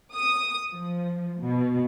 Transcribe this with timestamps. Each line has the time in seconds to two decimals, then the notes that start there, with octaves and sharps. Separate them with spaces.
0.14 D#6
0.71 F3
1.39 B2